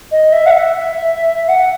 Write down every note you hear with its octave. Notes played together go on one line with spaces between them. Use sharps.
D#5
E5
F#5
E5
F#5